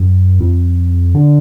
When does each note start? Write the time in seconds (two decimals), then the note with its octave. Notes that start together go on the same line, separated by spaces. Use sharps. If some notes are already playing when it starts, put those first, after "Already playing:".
Already playing: F#2
0.40 F2
1.14 D3